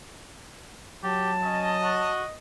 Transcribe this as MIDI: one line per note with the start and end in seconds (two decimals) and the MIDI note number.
1.04 2.11 54
1.04 1.31 67
1.04 2.11 81
1.44 1.77 61
1.44 2.37 75
1.83 2.23 66